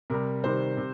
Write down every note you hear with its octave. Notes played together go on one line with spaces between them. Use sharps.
C3 G3 A#4
C3 D#3 G3 C5
C3